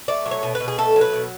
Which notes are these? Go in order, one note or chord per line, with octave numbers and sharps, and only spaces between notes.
A3 D5
F#3
C#5
B2
B4
B2
G#4
A3 A4
F#3
B4
B2